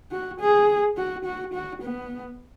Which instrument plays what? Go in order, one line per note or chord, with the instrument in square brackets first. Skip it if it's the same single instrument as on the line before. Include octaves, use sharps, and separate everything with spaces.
[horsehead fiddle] F#4
G#4
F#4
F#4
F#4
B3